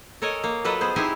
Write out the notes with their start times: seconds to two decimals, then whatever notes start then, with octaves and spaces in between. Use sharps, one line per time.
0.22 A4 A#4 C#5 D#5 G#5
0.44 A#3
0.64 F#3 F4 A4 B4 D#5
0.81 B3 G#4 C5
0.96 G#3 C4 D#4 E4 G4 G#5